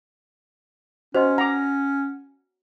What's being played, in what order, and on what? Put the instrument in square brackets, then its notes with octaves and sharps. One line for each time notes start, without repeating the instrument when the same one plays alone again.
[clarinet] C#4 [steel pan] F#4 [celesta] C5 D#5 C6
[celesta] F#5 [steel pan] A#5 D6